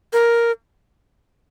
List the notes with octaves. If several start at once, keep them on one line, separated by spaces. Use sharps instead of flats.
A#4